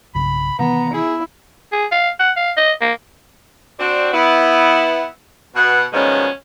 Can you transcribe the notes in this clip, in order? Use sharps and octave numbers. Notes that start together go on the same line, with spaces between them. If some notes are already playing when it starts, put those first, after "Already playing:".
B1 G2 C#3 B5
C3 D#3 E3 B3 A#5
E4 G#4
G#4
F5
F#5
F5
D#5
A#3
C4 D4 F#4
B3 E4
B2 F#5
B2 D#3 F3 G3 G#3 C#4